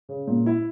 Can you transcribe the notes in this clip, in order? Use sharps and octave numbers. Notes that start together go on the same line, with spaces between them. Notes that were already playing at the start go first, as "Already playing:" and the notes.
C#3
A#2
E4